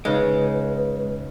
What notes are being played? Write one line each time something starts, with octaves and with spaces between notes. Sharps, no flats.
C#3 G#3 D#4 B4